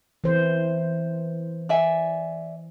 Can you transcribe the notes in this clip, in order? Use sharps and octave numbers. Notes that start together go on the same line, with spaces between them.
E3 C5
D5 E5 G#5